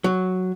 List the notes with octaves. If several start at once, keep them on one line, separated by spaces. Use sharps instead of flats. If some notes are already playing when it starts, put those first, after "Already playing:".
F#3